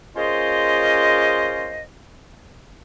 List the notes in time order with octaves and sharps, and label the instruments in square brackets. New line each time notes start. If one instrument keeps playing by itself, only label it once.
[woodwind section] A#3 C#4 F4 G#4 C5 D#5